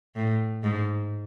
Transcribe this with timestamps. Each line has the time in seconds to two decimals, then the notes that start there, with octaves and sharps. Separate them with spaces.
0.16 A2
0.63 G#2